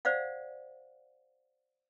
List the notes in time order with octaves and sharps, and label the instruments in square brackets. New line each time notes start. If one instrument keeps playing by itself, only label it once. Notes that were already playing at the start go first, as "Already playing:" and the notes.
[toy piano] C5 D5 F5 F#5